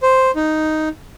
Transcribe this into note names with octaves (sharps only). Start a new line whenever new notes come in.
C5
D#4